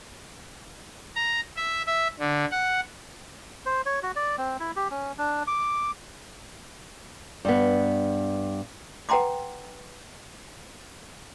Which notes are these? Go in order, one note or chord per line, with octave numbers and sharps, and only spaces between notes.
A#5
E5
E5
D3
F#5
C5
C#5
F#4
D5
C4
E4
G4
C#4
D4
D6
G2 B3
B4 F#5 G5 A#5 C6 D6